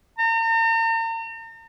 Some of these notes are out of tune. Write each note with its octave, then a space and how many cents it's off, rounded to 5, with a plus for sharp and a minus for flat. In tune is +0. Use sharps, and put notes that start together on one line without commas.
A#5 -45